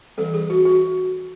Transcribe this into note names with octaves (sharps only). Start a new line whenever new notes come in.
E3 G3 C4 A4
G#4
F#4
F#4